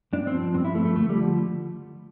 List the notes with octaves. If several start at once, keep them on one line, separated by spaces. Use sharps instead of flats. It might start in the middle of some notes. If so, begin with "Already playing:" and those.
G2 D4
C4
F3
G2 C4
E4
F3 A3
A3
D2 A3
G3
D3 F3